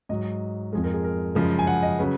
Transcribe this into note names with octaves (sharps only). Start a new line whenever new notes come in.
G#2 F#3 D#5
F2 F3 G#3 G#4
A#4
G#4
A#4
F#2 C#3 F3 G#3
G#5
F#5
D#5
C#3 F#3 B4